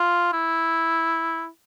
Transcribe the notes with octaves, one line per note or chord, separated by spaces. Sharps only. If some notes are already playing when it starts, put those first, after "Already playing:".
Already playing: F4
E4